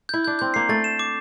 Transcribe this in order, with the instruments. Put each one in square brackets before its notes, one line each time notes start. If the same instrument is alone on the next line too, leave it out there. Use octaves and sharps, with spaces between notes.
[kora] E4 [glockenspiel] G6
[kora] D4 [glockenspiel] G6
[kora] C4 [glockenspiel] G6
[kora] A#3 [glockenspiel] C7
[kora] A3 [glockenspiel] A6
[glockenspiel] E7
D6